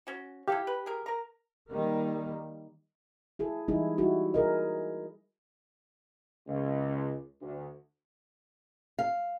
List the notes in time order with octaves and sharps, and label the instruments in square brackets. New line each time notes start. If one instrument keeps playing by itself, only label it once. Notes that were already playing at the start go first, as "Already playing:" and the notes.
[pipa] C#4 F#4
[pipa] E4 A4 F5 [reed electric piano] G4
[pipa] B4
G#4 A#4
A#4 A#5
[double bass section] D#3 G3 A#3
[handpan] E4 G#4 A4
E3 G3 G#3 D#4 E4 G#4
G3 D#4 E4 F#4 G#4
G#4 A#4 D#5
[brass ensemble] C#2
D2
[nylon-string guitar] F5